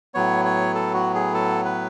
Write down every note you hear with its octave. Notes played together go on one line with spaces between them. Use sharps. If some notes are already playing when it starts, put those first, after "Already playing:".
A2 F#3 B3 C#5
C#5
A4
F#4
G#4
A4
B4